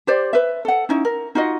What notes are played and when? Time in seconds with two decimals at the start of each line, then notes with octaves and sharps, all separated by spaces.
0.07 G4 C5 D5
0.33 B4 E5
0.65 A4 F#5
0.89 C#4 D#4 E4
1.05 A#4
1.35 D#4 F4 F#4 D#5